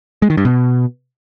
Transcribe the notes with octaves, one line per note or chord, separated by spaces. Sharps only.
G#3
D#3
G2
B2